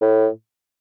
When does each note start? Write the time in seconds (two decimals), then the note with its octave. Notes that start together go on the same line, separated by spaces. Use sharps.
0.01 A2